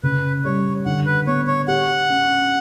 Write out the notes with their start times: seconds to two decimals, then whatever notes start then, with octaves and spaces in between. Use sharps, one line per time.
0.03 C#3 B4
0.45 G3 C#5
0.86 D3 F#5
1.06 B4
1.27 B3 C#5
1.47 C#5
1.68 G4 F#5
2.09 C#4